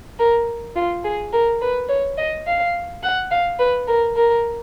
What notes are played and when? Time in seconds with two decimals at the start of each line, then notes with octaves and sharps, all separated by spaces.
0.19 A#4
0.76 F4
1.04 G#4
1.33 A#4
1.62 B4
1.89 C#5
2.18 D#5
2.47 F5
3.03 F#5
3.31 F5
3.59 B4
3.88 A#4
4.16 A#4